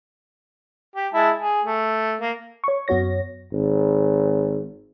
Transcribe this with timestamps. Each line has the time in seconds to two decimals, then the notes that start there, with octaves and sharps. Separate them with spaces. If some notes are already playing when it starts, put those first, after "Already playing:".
0.96 G4
1.14 G#3 E4 A5
1.39 G#4
1.64 A3
2.21 A#3
2.64 C#5 C#6
2.88 F#2 B3 F#4 C#5 A#6
3.53 G#1